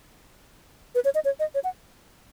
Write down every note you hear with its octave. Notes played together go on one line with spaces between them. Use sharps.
B4
C#5
D#5
C#5
D#5
C#5
F#5